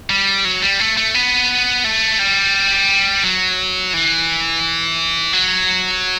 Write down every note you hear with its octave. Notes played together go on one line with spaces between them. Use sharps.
G3
F#3
G3
A3
A3
B3
A3
G3
F#3
E3
F#3